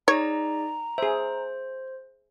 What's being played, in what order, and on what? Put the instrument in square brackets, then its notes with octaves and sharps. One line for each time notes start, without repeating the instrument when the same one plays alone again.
[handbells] D#4 G#4 D5 [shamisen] C#5 [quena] A#5
[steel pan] G#4 E5 [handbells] C5